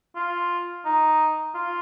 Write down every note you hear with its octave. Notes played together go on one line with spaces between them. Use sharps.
F4
D#4
F4